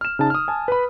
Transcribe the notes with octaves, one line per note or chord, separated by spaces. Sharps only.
F6 E7
C#3 D#4 A5
D#6 F6
G#5 A5
B4 B5